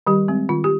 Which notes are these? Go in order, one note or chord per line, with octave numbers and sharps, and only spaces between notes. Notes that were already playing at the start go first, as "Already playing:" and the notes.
D#3 G3 G4
G#3 C4
D#3 F4
G4